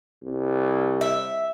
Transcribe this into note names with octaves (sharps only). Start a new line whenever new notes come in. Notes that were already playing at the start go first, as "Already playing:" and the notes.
C2
E5